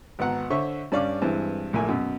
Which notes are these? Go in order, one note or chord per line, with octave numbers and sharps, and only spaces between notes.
G#1 B3 F#5 A#5
D3 C5 C#5 E5 C#6
G2 C#4 D5 F5 D6
G2 E3 G#3 C4
A#1 A#2 A3 A#3 G#5
F#2 B2